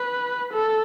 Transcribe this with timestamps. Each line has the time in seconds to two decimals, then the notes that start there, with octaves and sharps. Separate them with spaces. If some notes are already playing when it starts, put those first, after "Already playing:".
Already playing: B4
0.53 A4